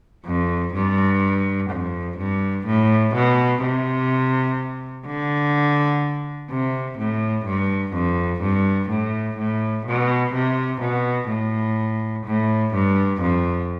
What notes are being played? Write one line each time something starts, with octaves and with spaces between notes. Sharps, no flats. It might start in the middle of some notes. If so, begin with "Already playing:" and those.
F2
G2
F2
G2
A2
B2
C3
D3
C3
A2
G2
F2
G2
A2
A2
B2
C3
B2
A2
A2
G2
F2